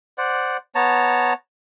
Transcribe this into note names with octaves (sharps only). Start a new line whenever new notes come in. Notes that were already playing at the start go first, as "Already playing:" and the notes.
C5 D5 F#5
B3 C#5 A5 A#5